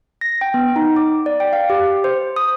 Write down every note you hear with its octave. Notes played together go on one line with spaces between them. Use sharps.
A#6
G5
B3
D#4
D6
D5
G5
F5
G4
C5
D#6